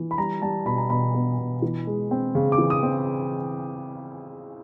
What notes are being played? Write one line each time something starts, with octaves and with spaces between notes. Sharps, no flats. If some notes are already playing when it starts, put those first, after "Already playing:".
Already playing: E3
B5
G3 A#5
G3 A5
B2 B5
A#5
B2 B5
B3
B2
E3
G#3
C4
C#3
D6
E3
D#6
C4